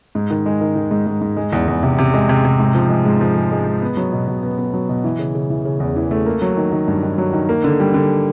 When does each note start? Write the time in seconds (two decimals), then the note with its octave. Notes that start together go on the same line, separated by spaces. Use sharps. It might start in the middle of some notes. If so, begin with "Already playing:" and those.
0.15 G#2
0.30 D#3
0.46 G#3
0.61 D#3
0.76 D#3
0.91 G#2
1.07 G#2
1.22 G#2
1.37 G#3
1.53 E2
1.68 E2
1.83 C3
1.98 C3
2.14 G#3
2.29 C3
2.44 C3
2.59 G#2
2.75 F3
2.90 G#3
3.05 G#2
3.21 F3
3.36 G#3
3.51 G#3
3.66 G#3
3.82 B3
3.97 F#3
4.13 B2
4.28 B2
4.43 B3
4.58 B3
4.74 F#3
4.89 B2
5.04 E3
5.19 C#3
5.35 C#3
5.50 E3
5.65 C#3
5.80 E2
5.96 E3
6.11 A3
6.26 A#3
6.42 F#3
6.57 D#3
6.72 D#3
6.88 G2
7.03 D#3
7.18 F#3
7.33 D#3
7.49 A#3
7.64 D3
7.80 G3
7.94 D3